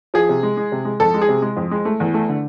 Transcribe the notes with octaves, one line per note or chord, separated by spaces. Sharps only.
F3 G#4
C3
G#3
G#3
C3
G#3
F2 A4
G#3
G#4
C3
G#3
F2
G#3
A3
E2
A3
D3